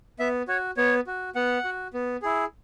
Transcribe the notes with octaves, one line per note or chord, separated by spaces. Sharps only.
B3 E5
F#4 C#5
B3 C#5
F#4
B3 F#5
F#4
B3
E4 G#4